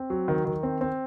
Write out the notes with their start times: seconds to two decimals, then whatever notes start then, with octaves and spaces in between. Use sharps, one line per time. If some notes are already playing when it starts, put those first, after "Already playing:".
Already playing: C4
0.10 F#3
0.28 D#3
0.45 D#3
0.63 C4
0.81 C4